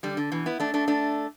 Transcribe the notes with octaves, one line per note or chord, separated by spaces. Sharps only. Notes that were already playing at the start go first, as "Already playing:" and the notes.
D3 G3
D3
B2 E3
B3 E4
A3 D4
A3 D4
A3 D4